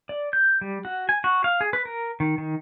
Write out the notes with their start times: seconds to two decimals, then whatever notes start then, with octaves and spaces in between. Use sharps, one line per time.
0.09 D5
0.33 G6
0.61 G3
0.85 F#4
1.09 G#5
1.24 F#4
1.44 F5
1.61 G#4
1.73 B4
1.85 A#4
2.20 D#3
2.38 D#3